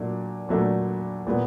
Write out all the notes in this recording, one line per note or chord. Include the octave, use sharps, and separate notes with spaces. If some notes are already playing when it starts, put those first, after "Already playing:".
Already playing: A#2 F#3 A3 D4
A#2 F#3 A3 D4
A#2 G3 B3